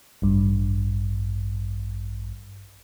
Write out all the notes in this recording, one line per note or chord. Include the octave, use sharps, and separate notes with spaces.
A1 G2